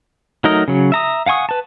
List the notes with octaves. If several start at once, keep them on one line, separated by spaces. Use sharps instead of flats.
F#3 A3 D#4 A#4 D#5
C#3 F#3
E5 A#5 D#6
F5 F#5 G#5 C#6 D#6
B4 A5